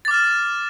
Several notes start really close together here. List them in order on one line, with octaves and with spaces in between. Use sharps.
A6 D6 F6 E7